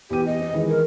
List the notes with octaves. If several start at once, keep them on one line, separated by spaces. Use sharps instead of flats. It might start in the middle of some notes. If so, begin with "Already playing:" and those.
E2 G4 D#7
D#5
C4
D#3 E3 G#3
A#4